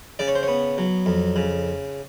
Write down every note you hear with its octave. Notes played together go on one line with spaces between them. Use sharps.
C#3 D5
C#5
C5
B3 C#5
F#3
F2
C#3